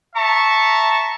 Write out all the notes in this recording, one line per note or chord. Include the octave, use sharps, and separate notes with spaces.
E5 A5 A#5 C#6